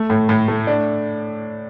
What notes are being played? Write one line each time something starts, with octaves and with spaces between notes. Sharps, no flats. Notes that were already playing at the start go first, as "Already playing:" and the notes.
Already playing: A3
A2
A2
A3
D4